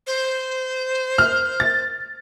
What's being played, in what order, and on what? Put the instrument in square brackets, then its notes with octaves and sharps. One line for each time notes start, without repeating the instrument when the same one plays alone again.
[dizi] C5
[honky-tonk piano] F6
A6